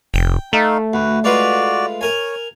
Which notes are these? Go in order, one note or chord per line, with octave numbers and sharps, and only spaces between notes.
F1 G5
A3 D#4 F5
D2 F#4 B4
G#3 F4 F#4 B4 D5
A#4 C#5 G#5